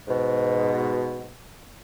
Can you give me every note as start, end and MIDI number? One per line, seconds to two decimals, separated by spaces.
0.08 1.31 44
0.08 1.31 47